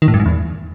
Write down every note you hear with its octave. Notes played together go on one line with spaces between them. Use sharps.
D#3
A2
G2
G#2
E2